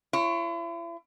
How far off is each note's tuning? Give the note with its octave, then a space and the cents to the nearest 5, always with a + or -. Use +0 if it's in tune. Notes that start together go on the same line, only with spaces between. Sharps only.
E4 +45 C#5 -15